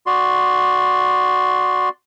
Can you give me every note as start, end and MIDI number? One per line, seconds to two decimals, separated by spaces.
0.06 1.89 66
0.06 1.89 74
0.06 1.89 84